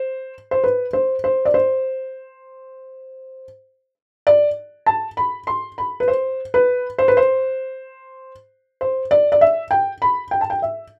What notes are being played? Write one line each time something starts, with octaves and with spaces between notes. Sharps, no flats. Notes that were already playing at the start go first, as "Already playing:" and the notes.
Already playing: C5
C5
B4
C5
C5
D5
C5
D5
A5
B5
C6
B5
B4
C5
B4
C5
B4
C5
C5
D5
D5
E5
G5
B5
G5
A5
G5
E5